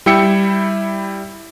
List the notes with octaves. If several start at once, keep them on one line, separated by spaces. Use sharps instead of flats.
G3 E4 G5 E6 C#7